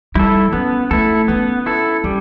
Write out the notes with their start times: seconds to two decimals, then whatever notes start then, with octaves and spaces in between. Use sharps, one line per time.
0.15 G3 E4 A4
0.53 B3 C#4
0.91 A3 E4 A4
1.28 B3 C#4
1.66 E4 A4
2.04 G3 C#4